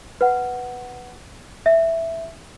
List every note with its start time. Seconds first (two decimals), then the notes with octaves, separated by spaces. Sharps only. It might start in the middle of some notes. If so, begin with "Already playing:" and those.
0.21 B4 F#5
1.66 E5